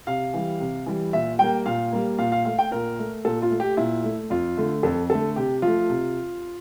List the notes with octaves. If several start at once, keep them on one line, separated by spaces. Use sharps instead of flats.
C3 F5
E3 G3
C3
E3 G3
A#2 E5
G3 A#3 G5
A#2 F5
G3 A#3
A#2 F5
F5
A3 F5
G5
A#2 A#4
A3
A#2 A4
F4
A3
G4
A#2 E4
A3
F2 F4
D3 A3
F2 A4
D3 A3 A4
C3 G4
F3 A3 F4
C3